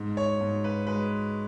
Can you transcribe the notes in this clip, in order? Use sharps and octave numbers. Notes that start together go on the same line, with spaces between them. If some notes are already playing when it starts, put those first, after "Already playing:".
Already playing: G#2
C#5
G#2
B4
G#3 B4